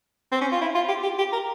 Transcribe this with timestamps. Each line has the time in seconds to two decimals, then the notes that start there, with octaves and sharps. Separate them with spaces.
0.32 C4
0.41 C#4
0.52 F4
0.61 E4
0.75 F4
0.89 G4
1.03 G4
1.18 G4
1.32 A#4